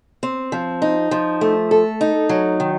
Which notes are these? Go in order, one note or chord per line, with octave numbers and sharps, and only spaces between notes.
C4
F3
D#4
F3
A3
A4
D#4
F#3
D#3